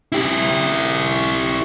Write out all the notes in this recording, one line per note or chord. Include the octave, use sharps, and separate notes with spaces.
E4 G4